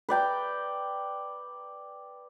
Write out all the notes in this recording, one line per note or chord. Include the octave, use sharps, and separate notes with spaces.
B4 D5 G5 A#5